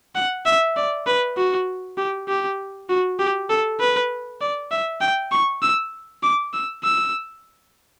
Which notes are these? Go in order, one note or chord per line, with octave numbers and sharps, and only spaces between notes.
F#5
E5
D5
B4
F#4
G4
G4
F#4
G4
A4
B4
D5
E5
G5
C#6
E6
D6
E6
E6